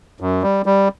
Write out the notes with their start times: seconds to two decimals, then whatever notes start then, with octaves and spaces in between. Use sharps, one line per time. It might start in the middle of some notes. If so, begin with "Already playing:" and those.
0.20 F#2
0.42 G3
0.66 G3